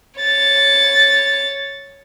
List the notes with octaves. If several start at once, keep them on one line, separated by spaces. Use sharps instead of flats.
C#5 A6